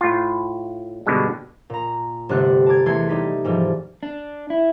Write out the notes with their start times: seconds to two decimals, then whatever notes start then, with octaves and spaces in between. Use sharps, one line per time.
0.01 A2 F4
1.06 G2 B2 D3 G#3 F#4
1.70 A#2 A#5
2.29 G1 C3 G3 A3 F#6
2.66 A5 A#5 D6 G#6
2.86 E2 E3 A3 C6 G#6
3.09 G3 D#4 B6
3.44 G#2 E3 F3 G3 A3
4.03 D4
4.50 E4